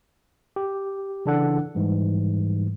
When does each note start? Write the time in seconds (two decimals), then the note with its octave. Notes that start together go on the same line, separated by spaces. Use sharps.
0.56 G4
1.26 C#3 E3 D4 E4 A4 F#5
1.75 G#2 E3 G3